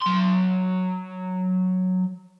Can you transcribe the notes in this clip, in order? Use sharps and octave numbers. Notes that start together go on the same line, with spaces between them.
F#3 C6